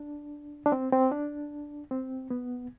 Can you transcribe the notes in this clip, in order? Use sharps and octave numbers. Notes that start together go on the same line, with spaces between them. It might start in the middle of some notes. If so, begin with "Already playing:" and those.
Already playing: D4
D4
C4
C4
D4
C4
B3